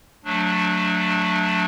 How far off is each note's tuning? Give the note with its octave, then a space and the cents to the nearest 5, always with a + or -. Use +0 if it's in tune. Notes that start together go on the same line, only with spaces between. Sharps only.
F#3 -20 A3 +0 D4 +0